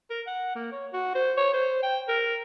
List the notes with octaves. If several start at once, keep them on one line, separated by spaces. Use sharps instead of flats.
A#4
F#5
A#3
C#5
F#4
C5
C#5
C5
G5
A#4